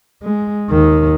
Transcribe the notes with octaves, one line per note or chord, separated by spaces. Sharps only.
G#3
D#2 D#3